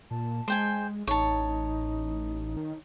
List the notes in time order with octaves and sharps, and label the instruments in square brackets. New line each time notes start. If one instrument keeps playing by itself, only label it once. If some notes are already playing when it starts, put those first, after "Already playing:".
[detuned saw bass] A#2 [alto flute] A5
[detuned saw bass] G#3 [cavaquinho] C5 G5 G#5
[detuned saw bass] A1 [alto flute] D#4 [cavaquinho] C#5 A5
[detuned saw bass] D#3